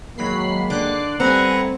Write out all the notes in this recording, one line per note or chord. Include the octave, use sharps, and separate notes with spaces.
D#3 F#3 G#3 A#3 B5 C7
D3 D6 F#6 C7
G3 A3 C4 B4 F#5 G#5 A#5 C#7